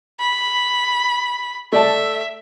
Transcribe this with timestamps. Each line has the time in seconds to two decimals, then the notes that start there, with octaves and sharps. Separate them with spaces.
0.20 B5
1.72 A3 D5 E5 A5